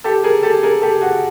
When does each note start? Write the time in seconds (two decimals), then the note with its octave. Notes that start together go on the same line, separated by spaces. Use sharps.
0.04 G4 A4
0.24 G#4 A#4
0.43 G4 A4
0.63 G#4 A#4
0.82 G4 A4
1.01 F#4 G#4